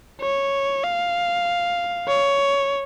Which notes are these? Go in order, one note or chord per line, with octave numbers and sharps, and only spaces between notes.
C#5
F5
C#5